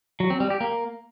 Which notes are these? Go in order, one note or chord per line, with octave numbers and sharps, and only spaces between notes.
F#3
C4
G3
G4
A#3